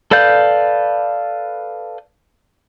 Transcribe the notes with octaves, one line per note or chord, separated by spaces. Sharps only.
A4 B4 D5 F5 G6